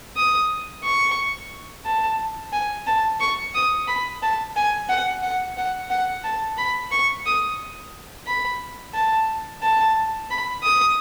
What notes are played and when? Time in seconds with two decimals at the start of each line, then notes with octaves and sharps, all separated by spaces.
0.17 D#6
0.84 C#6
1.85 A5
2.52 G#5
2.87 A5
3.20 C#6
3.55 D#6
3.88 B5
4.22 A5
4.56 G#5
4.89 F#5
5.23 F#5
5.58 F#5
5.90 F#5
6.24 A5
6.58 B5
6.92 C#6
7.26 D#6
8.27 B5
8.94 A5
9.63 A5
10.30 B5
10.63 D#6